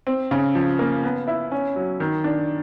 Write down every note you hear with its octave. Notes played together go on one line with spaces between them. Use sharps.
C4
C#3
F3
A#3
B3
E4
C#4
F#3
D#3
D4